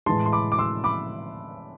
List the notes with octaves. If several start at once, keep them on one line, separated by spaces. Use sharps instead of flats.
A2 E3 G#3 A5 C6
C6
B5 D6
D6
C6 E6
B5 D6